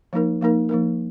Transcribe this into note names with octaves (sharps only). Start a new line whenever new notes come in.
F3 A#3 D#4 A#4
F3 A#3 D#4 A#4
F3 A#3 D#4 A#4